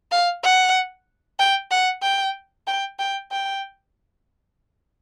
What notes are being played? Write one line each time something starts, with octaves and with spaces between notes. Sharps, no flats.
F5
F#5
G5
F#5
G5
G5
G5
G5